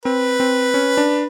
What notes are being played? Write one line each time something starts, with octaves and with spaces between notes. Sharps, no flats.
C4 B4
C4
C#4
D4